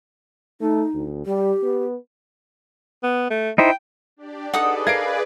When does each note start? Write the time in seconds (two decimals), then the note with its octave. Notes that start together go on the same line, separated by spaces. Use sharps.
0.61 A3 D#4
0.94 D2
1.26 G3 G4
1.63 B3
3.03 B3
3.30 A3
3.58 D#4 E4 C5 G5
4.17 D4 G4 D5
4.54 D#4 G#4 A4 B4 D5 F#5 D#6
4.87 A#4 D#5 F5 G#6 C7 D7